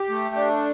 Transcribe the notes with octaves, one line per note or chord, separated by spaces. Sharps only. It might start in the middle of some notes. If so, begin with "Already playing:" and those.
Already playing: G4
A3
D4